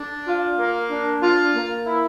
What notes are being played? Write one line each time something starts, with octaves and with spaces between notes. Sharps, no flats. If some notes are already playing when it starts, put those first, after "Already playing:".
Already playing: D4
F4
A#3
D4
F4
A#3
E4